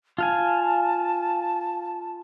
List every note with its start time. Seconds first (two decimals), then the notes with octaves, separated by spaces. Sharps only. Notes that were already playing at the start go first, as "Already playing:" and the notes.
0.18 F4 F5 G#5 A5